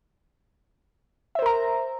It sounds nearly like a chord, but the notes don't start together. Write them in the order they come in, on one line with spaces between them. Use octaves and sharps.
E5 C5 A#4 A#5